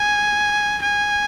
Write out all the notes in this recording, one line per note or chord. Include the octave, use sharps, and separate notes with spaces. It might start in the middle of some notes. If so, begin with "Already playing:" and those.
Already playing: G#5
G#5